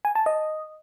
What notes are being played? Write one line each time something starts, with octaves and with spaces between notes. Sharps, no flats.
G#5
A5
D#5